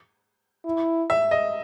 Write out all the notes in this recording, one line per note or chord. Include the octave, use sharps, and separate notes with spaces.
E4
E5
D#5